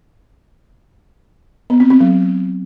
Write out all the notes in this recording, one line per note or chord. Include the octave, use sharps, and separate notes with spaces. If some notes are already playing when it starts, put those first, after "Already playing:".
B3
C4
C4
F#3